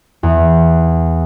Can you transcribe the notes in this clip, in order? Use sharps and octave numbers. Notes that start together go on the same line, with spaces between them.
E2